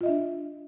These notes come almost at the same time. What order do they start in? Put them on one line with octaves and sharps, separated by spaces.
F4 D#5 E5 D4